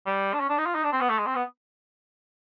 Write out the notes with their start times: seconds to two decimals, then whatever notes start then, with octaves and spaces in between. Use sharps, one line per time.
0.06 G3
0.34 D4
0.40 C#4
0.50 D4
0.58 D#4
0.66 F4
0.75 D#4
0.84 D4
0.92 C4
1.01 B3
1.10 A3
1.19 G#3
1.27 C4
1.36 B3